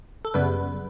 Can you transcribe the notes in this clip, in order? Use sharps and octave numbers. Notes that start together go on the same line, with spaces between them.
A4
F#2 C#3 G3 B3 B4